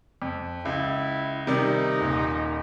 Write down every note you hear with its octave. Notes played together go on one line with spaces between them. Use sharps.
F2
C#2 E4
C3 D#3 G3 D#4
D#1 A#2